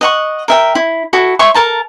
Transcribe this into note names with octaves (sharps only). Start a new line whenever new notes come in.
D#5 F#5 C#6
A#4 E5 G5
E4
E4 F#4 A4
C#5 E5 C6 C#6
A4 A#4 A5 A#5